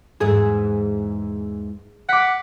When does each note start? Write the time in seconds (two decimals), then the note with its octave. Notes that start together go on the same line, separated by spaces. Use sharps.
0.20 E2 G#2 E3 G#4
2.09 F#5 D6 B6